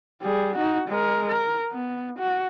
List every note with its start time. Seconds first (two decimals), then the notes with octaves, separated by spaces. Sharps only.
0.22 G3 G#4
0.56 D#4 F#4
0.88 G#3 A#4
1.28 A#4
1.72 B3
2.18 F#4